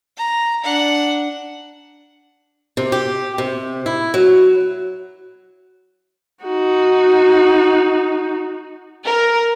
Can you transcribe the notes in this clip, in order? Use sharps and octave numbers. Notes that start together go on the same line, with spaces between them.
A#5
D4 F#5
C3
G4
C3
E4
F#3
D#4 F#4
A#4